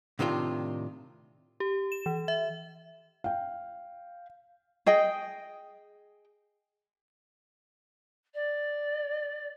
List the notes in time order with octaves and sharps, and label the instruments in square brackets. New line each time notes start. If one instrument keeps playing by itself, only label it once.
[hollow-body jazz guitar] A2 C3 D#3 D4 F4
[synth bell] G4
E7
E3
E5
[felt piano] F5 G5
[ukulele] G#4 D#5 G5
[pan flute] D5